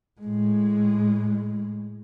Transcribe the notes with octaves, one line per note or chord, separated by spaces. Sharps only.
A2 G#3